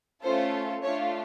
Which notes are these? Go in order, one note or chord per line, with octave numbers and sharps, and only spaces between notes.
A3 C#4 F4 A4 C5
A3 D4 F4 C#5